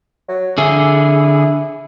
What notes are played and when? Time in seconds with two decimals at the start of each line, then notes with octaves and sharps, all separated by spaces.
0.29 F#3
0.58 D3 E4 G#4